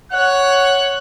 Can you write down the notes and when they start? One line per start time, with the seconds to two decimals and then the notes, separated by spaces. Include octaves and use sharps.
0.12 C#5 F#5 F#6